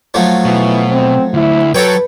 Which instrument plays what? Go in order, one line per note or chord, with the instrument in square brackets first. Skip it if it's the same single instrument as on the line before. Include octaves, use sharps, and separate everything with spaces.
[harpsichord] F3 F#3 A3
[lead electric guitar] B2 [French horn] E3
[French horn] C4
[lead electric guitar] D2 [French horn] E4
[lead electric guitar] F#3 [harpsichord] A4 C#5 G5 [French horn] B4